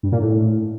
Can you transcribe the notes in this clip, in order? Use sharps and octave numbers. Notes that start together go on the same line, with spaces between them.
G2
A#2
A2